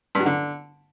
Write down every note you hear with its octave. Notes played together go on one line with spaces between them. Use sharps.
G2
F#3
D3